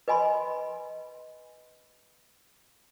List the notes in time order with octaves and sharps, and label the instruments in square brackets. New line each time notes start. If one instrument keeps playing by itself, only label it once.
[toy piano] B4 D#5 G#5 B5 C6